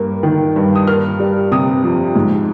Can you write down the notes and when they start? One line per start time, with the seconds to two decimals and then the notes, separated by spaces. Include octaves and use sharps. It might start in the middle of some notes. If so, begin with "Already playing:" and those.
Already playing: G2 A#3
0.23 D#3
0.56 G2
0.76 D#6
0.87 A#3 F6
1.20 G3
1.51 C3 D#6
1.84 F2
2.16 G#2